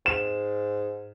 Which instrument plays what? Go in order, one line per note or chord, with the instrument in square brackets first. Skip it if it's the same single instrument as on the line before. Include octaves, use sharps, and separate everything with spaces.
[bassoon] G#2 [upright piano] E7